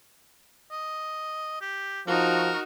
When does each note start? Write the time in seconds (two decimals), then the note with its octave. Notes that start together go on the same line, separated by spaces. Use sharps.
0.71 D#5
1.61 G4
2.07 F3 D#4 F#4 A#4